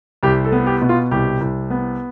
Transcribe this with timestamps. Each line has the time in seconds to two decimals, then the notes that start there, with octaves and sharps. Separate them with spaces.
0.23 C2 G4
0.44 A4
0.52 B3
0.67 G4
0.82 B2
0.89 F4
1.11 C2 G4
1.41 C2
1.70 B3